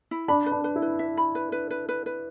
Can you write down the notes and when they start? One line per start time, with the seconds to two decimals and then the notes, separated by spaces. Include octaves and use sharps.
0.11 E4
0.28 D4 B5
0.46 B4
0.52 D4
0.64 B4
0.76 E4
0.82 B4
0.99 E5
1.17 B5
1.35 B4
1.52 B4
1.71 B4
1.89 B4
2.06 B4